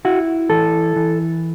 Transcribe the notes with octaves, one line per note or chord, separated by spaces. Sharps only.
E4 F#4
E3 A4
E3